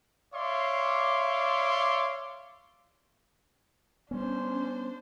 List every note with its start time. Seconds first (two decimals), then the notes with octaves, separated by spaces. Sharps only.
0.34 C#5 D5 E5 F5 C6 D6
4.11 G3 B3 C#4 D4 C5